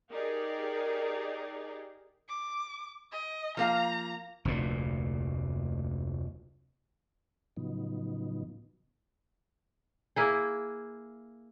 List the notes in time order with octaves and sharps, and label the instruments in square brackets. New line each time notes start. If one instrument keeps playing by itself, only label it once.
[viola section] D#4 G4 G#4 A#4 D5
[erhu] D6
D#5
[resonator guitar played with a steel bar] F3 A#3 F5 [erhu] A#5
[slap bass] F1 D2 A#2
[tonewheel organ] A2 C#3 F3 F#3 B3 D#4
[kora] A#3 E4 G#4